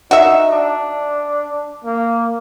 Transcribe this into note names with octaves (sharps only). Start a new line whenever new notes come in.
D#4 F#4 E5
D4
A#3